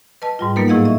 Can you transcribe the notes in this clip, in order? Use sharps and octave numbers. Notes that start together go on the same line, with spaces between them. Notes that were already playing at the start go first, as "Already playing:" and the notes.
B4 D#5 A5
G#2 G3 F4
F#3 A#3 B3 D#4 A#4 B4
A2 E4 G#4 D#5 F5 F#5
D#5 E5 C#6